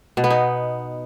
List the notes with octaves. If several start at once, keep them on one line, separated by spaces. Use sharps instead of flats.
B2
B3
D#4